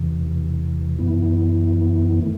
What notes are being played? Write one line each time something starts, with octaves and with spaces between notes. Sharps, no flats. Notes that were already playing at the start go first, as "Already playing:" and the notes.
Already playing: E2 C3 E3
F#2 E3 B3 E4
D#3 A3